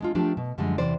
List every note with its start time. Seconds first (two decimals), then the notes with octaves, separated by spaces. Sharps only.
0.01 G#3 D4 F4
0.15 F3 A3 D4 F4 G4
0.37 B2
0.58 F#2 D3 F3 G3 G#3
0.78 E2 C3 E3 C5 D5